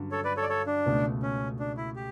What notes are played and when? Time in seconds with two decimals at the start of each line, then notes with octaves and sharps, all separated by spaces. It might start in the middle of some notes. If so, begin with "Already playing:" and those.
Already playing: G2 D3 F#3 C#4 F#4
0.11 A4 C#5
0.24 B4 D5
0.37 A4 C#5
0.42 D5
0.49 A4 C#5
0.66 D4
0.85 C#2 B2 A3
1.22 C#4
1.59 D4
1.77 E4
1.96 G4